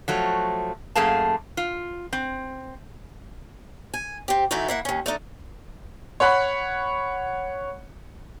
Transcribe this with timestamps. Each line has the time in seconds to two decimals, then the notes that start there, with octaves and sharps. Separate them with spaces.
0.08 F3 F#3 A3
0.95 F#2 A3 A#3 G#4 F5 A5
1.57 F4
2.13 C4
3.94 G#5
4.28 C4 G4
4.51 E3 A3 B3 D#4 E4 F#4
4.68 A#3 E4 F#5
4.85 D#2 C#4
5.06 A3 D4 D#4
6.20 C#5 F#5 B5 F#6